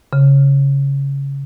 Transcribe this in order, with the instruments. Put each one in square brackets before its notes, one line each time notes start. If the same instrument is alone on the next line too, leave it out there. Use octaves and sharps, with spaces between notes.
[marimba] C#3